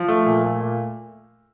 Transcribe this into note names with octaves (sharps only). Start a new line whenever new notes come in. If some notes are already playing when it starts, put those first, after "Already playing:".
Already playing: F3
A3
A#2
A3
A#2